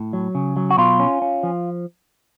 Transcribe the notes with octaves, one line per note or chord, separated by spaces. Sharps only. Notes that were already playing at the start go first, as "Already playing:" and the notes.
Already playing: A2
F#3
C#3
F#3
F#4
B2 F4
C#4
C#4
F3